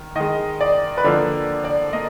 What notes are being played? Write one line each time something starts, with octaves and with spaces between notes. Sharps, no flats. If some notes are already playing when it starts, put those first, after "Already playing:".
Already playing: D#3
D#3 G#3 D#5
D5
B4
D3 F3 A#3 D5
D5
A#3 D#5